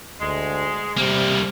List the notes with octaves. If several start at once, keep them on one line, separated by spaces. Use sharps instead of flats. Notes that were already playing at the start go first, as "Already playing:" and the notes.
D2 G#3
C3 G3 A#3